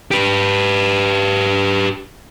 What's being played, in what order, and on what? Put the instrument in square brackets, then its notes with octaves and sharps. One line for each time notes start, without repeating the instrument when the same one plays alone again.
[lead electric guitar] G4 B4